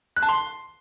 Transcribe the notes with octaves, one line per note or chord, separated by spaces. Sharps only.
F#6
A5
C6